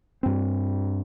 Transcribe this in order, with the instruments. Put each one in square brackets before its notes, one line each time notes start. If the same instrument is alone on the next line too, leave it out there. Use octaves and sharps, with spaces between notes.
[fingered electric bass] G2 C4